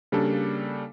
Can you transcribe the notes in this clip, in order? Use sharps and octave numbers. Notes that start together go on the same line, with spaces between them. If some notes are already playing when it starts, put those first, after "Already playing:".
C#3 G3 A#3 D4 A4